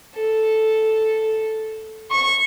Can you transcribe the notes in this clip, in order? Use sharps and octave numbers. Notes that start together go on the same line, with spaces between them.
A4
C#6